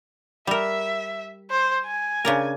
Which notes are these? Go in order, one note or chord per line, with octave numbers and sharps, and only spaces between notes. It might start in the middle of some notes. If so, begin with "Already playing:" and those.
G3 A#4 E5
C5
G#5
C#3 D4 A#4